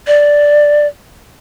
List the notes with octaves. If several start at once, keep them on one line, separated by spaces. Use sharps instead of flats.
D5